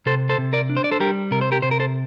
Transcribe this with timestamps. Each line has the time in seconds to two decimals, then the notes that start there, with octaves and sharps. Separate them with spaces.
0.06 C3 A4 C5
0.29 A4 C5
0.38 C3
0.53 A#4 D5
0.69 D4
0.77 C5
0.84 D5
0.91 A4 C5
1.00 G3 G4 A#4
1.31 C3 A#4
1.41 C5
1.52 G4 A#4
1.62 C3 C5
1.71 A#4
1.80 A4 C5